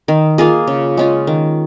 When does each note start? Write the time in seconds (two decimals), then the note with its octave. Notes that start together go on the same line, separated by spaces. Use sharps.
0.08 D#3
0.38 A#3 F4 G#4
0.67 C#3
0.97 G#3 C#4 F4
1.27 D#3